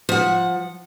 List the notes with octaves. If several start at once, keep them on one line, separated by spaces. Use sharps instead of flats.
F3 F#5